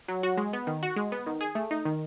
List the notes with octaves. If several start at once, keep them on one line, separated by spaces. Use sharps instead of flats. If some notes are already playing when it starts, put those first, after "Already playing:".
F#3
F#4
G#3
B3
D#3
F#4
G#3
B3
D#3
G#4
A3
D#4
D#3